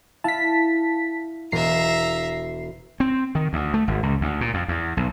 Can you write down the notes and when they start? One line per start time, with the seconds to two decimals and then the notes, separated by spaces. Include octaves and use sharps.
0.24 E4 F5 A5 B6
1.52 E1 E5 A#5 C7
3.00 C4
3.35 D#3
3.53 D2
3.74 A3
3.88 G#1
4.03 C#2
4.21 D2
4.41 A#2
4.54 F2
4.68 E2
4.97 B1